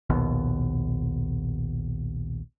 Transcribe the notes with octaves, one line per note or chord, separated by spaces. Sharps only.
A#1 D#2 B2